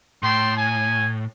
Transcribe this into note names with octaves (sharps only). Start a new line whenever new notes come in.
A2 G5 A5 C6
G#5